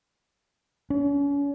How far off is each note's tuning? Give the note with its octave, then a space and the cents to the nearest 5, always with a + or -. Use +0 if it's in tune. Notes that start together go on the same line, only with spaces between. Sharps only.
C#4 +40